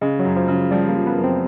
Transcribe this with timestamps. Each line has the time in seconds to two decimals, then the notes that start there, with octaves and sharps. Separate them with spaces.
0.01 C#3 G#3
0.19 F#3
0.24 F#2
0.36 F3
0.48 C#3
0.54 F#3
0.71 F3 G3
0.89 A#3
0.94 F3
1.06 B3
1.17 F#2
1.24 C4